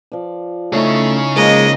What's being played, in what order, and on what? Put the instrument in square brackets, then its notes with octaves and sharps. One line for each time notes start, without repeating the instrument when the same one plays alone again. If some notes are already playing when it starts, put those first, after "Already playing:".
[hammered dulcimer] F3 D5
[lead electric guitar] C#3 C#5 [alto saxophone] A3 [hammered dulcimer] D#4 E4 B5
[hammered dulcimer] F3 A#3 F4 [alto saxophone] G#3 [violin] D#5